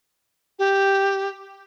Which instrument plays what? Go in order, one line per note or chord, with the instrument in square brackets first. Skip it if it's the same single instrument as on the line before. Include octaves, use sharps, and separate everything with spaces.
[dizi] G4